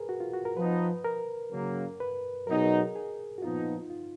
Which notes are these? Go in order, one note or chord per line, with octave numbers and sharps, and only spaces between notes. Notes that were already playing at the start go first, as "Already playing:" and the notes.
Already playing: G#4 A#4 B4
F#4
F4
F#4
A#4
F3 B3 D#4 B4
A#4
C#3 F#3 A#3
B4
B2 F#3 B3 D#4 A#4
G#4
A#4
G#4
F#4
A#2 F3 B3 D#4 F4
D#4
F4